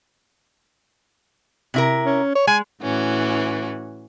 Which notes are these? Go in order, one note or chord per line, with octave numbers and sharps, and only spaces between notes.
C3 E4 A#4
C#4
C#5
G#3 G#5
A2 E3 C#4 F#4